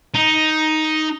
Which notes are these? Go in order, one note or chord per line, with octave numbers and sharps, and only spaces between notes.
D#4